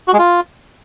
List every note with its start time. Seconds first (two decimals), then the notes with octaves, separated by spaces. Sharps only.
0.08 F#4
0.13 G#3
0.19 F4